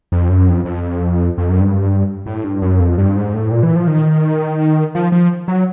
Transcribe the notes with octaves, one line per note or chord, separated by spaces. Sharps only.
F2
F#2
F2
F2
F2
F#2
G2
A2
G2
F#2
F2
G2
G#2
A2
A#2
E3
F3
D#3
F3
F3
F#3